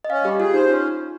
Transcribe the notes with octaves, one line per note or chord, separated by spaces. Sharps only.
D#5
C#4 F5
G3 G4
F4 G#4
D#4 C5
C#4 F4